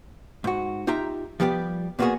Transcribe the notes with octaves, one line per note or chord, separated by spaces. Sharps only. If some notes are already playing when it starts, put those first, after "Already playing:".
G#2 F#4
D#4 F4 G4 E5 A#5
F3 G3 B3 G4 D5
A#2 A#3 B3 D#4 F#4 G#4